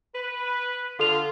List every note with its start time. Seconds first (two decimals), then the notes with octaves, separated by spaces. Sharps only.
0.15 B4
1.00 D3 F4 A4 F7